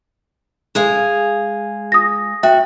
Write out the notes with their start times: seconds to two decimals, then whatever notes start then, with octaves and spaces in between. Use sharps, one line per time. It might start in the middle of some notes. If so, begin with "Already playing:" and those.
0.75 G#3 G#4 F5
1.92 D#6 A#6
2.43 F#4 E5 G5